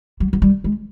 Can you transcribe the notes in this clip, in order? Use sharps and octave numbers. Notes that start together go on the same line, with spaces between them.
F#3
F#3
G3
G#3